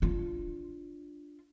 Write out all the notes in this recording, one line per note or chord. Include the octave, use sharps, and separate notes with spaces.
D4 F4